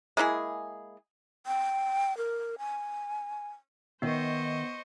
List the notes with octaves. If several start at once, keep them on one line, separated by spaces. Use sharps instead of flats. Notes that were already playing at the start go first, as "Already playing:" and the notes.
G#3 A#3 E4 G#4
G5
A#4
G#5
D#3 B3 C5 D#5 E5 C#6